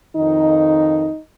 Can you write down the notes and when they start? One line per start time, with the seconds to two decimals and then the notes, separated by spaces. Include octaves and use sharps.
0.17 F2 D#3 D#4